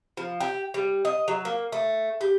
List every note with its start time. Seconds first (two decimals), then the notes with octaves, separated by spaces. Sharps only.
0.17 F3
0.40 G4
0.74 G3
1.05 D#5
1.28 F#3
1.45 A#3
1.72 A3
2.21 G4